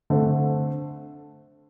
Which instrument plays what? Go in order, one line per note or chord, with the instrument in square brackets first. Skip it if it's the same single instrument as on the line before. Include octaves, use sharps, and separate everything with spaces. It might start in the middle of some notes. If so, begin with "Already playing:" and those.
[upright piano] D3 A3 C4